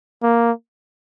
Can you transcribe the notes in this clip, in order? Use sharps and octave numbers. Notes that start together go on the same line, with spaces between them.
A#3